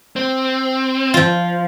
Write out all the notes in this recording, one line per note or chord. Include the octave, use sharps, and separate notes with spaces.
C4
F3 F4